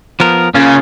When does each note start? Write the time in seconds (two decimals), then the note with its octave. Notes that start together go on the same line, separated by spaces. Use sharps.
0.20 F3 B3 A#4
0.55 C#3 A#3 C#4 F4